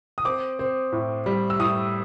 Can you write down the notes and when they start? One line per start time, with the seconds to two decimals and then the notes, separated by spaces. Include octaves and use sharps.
0.18 D#6
0.25 C4 D6
0.59 C4
0.92 A2
1.26 G3
1.50 E6
1.59 A2 D#6